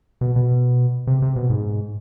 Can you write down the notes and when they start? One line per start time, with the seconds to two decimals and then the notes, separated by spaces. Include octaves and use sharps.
0.21 B2
0.36 B2
1.07 C3
1.22 C3
1.36 B2
1.50 G#2